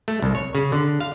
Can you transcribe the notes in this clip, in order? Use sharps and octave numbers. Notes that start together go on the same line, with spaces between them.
A3
C2
C#5
C#3
D3
F5